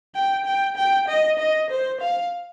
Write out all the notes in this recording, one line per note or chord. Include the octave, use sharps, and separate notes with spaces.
G5
G5
G5
D#5
D#5
C5
F5